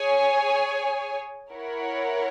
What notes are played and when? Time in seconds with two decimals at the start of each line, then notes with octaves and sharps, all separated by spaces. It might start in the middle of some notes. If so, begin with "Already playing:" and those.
Already playing: G#4 C#5 G#5
1.52 E4 A#4 C#5 F#5